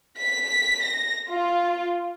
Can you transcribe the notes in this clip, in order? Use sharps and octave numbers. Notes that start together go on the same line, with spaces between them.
B6
A#6
F4